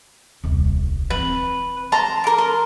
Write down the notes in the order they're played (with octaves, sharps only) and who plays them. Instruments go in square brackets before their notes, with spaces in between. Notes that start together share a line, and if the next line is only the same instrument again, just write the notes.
[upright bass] D#1 C2
[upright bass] E3 C4 [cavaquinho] B4
[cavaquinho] A5 C6 [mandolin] A#5
[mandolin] A#4 D6
[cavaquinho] C6